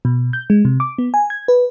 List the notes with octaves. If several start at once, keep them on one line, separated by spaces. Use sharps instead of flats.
B2
G6
G#3
C3
D6
B3
G#5
G#6
B4